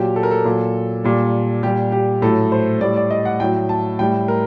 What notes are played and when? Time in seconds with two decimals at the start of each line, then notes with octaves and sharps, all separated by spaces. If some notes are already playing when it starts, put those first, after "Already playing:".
Already playing: A#2 F#3 G4
0.16 A4
0.23 A#4
0.31 A4
0.45 A#2 F#3
1.04 A#2 G3
1.63 A#2 G3 G4
1.92 G4
2.22 A2 F#3 A4
2.52 C5
2.81 A2 G3 D5
2.96 D5
3.11 D#5
3.25 F#5
3.40 A2 F#3 G5
3.69 A5
3.99 A2 G3 G5
4.28 A#4